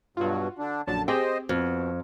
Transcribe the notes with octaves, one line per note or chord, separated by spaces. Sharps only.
G2 B2 F#3 F4 F#4
D3 D4
A#1 F#2 D3 A5
C4 G4 G#4 C5 D#5 G5
F2 B2